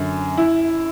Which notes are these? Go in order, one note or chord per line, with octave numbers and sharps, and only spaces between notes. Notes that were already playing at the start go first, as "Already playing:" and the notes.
Already playing: F#2 D3
E4